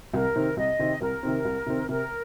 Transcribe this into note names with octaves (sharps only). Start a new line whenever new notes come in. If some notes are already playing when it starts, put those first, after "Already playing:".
C2 A#4
C3 D#3 C4
C2 D#5
C3 D#3 C4
C2 A#4
C3 D#3 C4
C2
C3 D#3 C4
C3 A#4